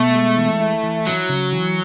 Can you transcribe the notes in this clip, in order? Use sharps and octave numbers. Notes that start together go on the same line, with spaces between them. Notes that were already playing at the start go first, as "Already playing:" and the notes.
Already playing: B2 A3
G#3
E3
E4
E3
F#3 E4
C#3
E3